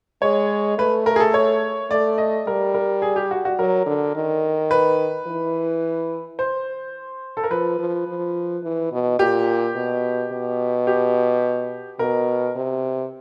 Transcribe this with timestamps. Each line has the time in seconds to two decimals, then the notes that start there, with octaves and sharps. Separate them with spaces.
0.22 G#3 C#5
0.78 A3 B4
1.06 A#4
1.16 G#4
1.20 A4
1.34 C#5
1.90 A3 D5
2.18 D#5
2.47 G3 A#4
2.74 A#4
3.02 G#4
3.16 G4
3.31 F#4
3.45 F#4
3.59 F#3 A#4
3.86 D3
4.15 D#3
4.71 B4
5.27 E3
6.39 C5
7.37 A4
7.44 A#4
7.51 F3 B4
7.79 F3
8.07 F3
8.63 E3
8.92 B2
9.19 A#2 G4
9.75 B2
10.32 B2
10.87 G4
11.99 B2 A#4
12.56 C3